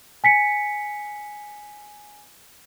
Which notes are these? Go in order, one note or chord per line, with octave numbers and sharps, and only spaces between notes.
G#5 B6 C#7